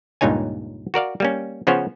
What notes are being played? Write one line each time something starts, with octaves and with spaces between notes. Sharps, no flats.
C#2 G2 A#2 D#4 C#5 G#5
F#4 A#4 D5 F5
G3 A#3 C#4
C#3 F3 B3 C#4 C5 C#5